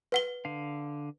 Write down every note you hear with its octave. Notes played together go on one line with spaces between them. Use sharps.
B4 F#5 G7
D3 F5